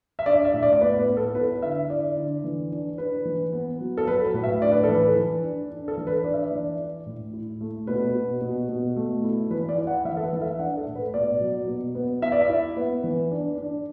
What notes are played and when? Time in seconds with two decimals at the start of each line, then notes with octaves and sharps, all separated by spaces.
0.19 E5
0.26 D4 D5
0.45 E5
0.54 A2
0.63 D5
0.73 D5
0.81 B3 B4
0.99 B4
1.08 B3
1.17 A4
1.35 E4 B4
1.62 D3 E5
1.90 E4 D5
2.16 D3
2.44 E3
2.71 D4
2.98 D4 B4
3.25 E3
3.53 B3
3.80 F#3
3.98 A4
4.07 F#3 B4
4.25 B4
4.34 A2
4.43 E5
4.62 D4 D5
4.72 B4
4.84 E3 A4
4.95 B4
5.16 E3
5.43 D4
5.70 D4
5.88 A4
5.97 E3
6.07 B4
6.24 D4 D5
6.34 E5
6.42 D5
6.51 E3
6.79 E4
7.06 A2
7.33 E4
7.61 A3
7.87 B2 B4
8.15 B2
8.42 B2
8.69 B2
8.96 A3
9.24 E4
9.50 E3 B4
9.69 D5
9.78 E4
9.87 F#5
10.00 F#5
10.05 E3 E5
10.17 A4
10.23 B4
10.33 E3
10.42 E5
10.59 D4 F#5
10.77 A4
10.87 A2
10.95 B4
11.14 B2 D5
11.41 F#3
11.68 B2
11.95 B3
12.22 E4 E5
12.32 D5
12.41 E5
12.49 E4
12.77 B3
13.04 E3
13.31 D4
13.58 D4